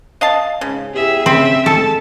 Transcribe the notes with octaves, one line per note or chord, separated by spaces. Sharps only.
D#5 F5 A5
G#2 C#3
B3 E4 G4 G#4 E5
C#3 C4 E5 B5
G#3 A4 A5